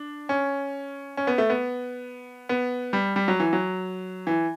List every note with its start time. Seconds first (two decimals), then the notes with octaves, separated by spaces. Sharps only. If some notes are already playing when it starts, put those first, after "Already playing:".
Already playing: D4
0.29 C#4
1.17 C#4
1.27 B3
1.38 A3
1.50 B3
2.49 B3
2.93 G3
3.16 G3
3.28 F#3
3.40 E3
3.53 F#3
4.27 E3